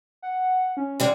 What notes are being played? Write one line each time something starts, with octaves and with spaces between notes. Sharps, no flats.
F#5
C#4
D3 G3 G#3